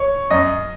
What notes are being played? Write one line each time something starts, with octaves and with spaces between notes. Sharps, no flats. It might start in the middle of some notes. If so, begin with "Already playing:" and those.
Already playing: C#5
F#2 D#5